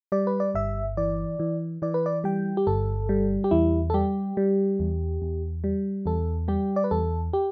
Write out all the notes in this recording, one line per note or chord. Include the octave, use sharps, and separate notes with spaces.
G3 D5
B4
D5
G1 E5
E3 D5
E3
E3 D5
B4
D5
G3 G5
G4
G1 A4
G3
G4
E2 E4
A4
G3 G4
G3
E2
E2
G3
E2 A4
G3 G4
D5
B4
E2 A4
G4